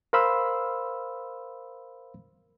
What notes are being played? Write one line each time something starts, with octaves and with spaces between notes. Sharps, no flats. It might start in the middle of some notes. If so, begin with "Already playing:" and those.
A#4 C5 F5 B5 C6 E6